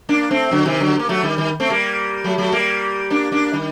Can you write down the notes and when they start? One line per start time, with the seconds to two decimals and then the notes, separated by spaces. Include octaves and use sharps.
0.09 A#3 D4
0.31 A3 C4
0.51 D3 F#3
0.65 C3 D#3
0.80 D3 F#3
0.99 A#3
1.09 F#3 A3
1.23 D#3 G3
1.38 D#3 G3
1.60 A3 C4
1.70 G3 A#3
2.24 F#3 A3
2.38 F#3 A3
2.52 G3 A#3
3.10 A#3 D4
3.32 A#3 D4
3.53 D#3 G3